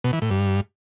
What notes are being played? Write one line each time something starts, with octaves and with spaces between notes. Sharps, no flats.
B2
E3
A2
G2